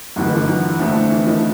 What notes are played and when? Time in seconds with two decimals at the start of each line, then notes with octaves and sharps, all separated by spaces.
0.16 G1 G2 D3 E3 F#3
0.26 D#3 F3
0.37 D#3 F3
0.47 E3 F#3
0.79 F2 D3 F3 A3
1.11 E3
1.27 D#3 F3